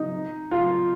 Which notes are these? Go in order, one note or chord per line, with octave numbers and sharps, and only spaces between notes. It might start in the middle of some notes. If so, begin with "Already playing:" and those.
Already playing: D#4
F4